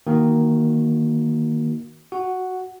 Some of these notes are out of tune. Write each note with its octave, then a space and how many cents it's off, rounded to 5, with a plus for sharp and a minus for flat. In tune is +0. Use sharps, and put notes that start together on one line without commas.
D#3 +0 A#3 +0 F#4 +0
F#4 +0 F#5 +0